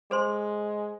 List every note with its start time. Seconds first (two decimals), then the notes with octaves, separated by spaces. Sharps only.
0.11 G#3 A4 C5 C6